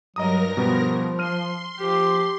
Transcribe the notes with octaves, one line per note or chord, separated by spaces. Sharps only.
G2 F#3 A#4 D#5 A#5 D#6 A#6
B2 F3 G3 B3
C6 F6 D#7
F3 G4